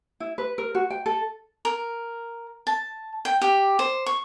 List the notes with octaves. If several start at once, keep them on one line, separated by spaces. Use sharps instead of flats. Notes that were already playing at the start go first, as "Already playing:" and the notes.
E4
B4
A#4
F#4
G5
A4
A#4
A5
G5
G4
C5
C#6